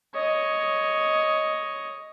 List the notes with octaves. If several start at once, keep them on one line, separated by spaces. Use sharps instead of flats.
C#5 D#5